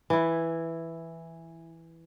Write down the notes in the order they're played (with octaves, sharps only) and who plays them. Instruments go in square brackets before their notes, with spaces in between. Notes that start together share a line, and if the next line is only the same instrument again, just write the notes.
[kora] E3 E4